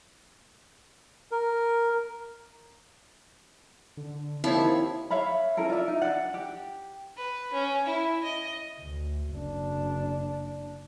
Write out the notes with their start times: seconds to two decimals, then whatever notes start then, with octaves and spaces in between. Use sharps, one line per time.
1.31 A#4
3.97 D3
4.44 D#2 F3 C4 E4 C#5
5.11 C#5 E5 F5 B5
5.57 C#4 E4 A4 A#4
5.69 F4 D5 E5
5.88 D#4
6.02 D4 D5 F#5
6.34 G4
7.17 B4
7.53 C#4
7.87 E4
8.23 D#5
8.80 D2
9.35 F#1 D4